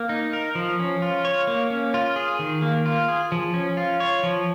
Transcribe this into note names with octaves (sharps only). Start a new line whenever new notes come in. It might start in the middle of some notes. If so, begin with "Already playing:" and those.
Already playing: A#3
D#4
A#4
F3
C#4
F4
C#5
A#3
C#4
F4
G#4
D#3
A#3
F4
G#4
F3
C#4
F4
C#5
F3